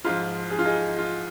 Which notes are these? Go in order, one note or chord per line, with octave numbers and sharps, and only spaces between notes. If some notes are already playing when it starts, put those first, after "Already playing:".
G#2 F3 F4
G#4
F4
D#4 G#4
F4